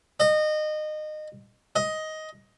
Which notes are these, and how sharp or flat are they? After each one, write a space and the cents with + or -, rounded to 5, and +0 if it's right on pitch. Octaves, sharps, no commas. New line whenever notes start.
D#5 -25
D#5 +10